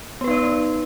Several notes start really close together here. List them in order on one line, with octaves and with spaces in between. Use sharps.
B3 B4 D#4 D5